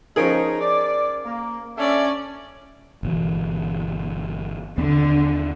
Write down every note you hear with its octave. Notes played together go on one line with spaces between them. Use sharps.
F3 C#4 D#4 G#4 A#4 D7
D5
A#3
C#4 D4 A4 D5 E5
G1 B2 E3
D#2 D3 B3 C4